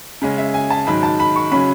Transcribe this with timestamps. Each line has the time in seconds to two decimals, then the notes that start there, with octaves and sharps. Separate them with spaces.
0.22 C#3 G#3 C#4
0.38 E5
0.54 G#5
0.70 A5
0.87 G#2 D#3 F#3 B5
1.03 A5
1.20 B5
1.36 C#6
1.52 C#3 F#3 C#4 B5